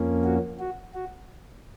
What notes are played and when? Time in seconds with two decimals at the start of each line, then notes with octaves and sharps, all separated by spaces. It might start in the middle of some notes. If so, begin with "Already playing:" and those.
Already playing: F2 F3 A#3 C#4
0.24 F#4
0.59 F#4
0.94 F#4